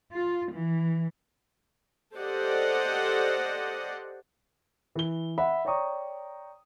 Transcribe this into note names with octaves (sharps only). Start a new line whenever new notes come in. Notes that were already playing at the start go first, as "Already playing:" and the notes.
F4
E3
G4 A4 C5 D5 D#5 F#5
E3 G7
E5 F#5 B5
C#5 D5 G5 A#5 C#6 D#6